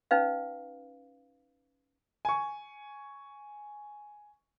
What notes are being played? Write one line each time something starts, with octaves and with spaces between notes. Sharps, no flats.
C#4 D#4 B4 F5
G#5 C#6